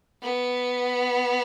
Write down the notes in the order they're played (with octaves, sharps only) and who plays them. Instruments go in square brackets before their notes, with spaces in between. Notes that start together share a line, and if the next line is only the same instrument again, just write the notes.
[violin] B3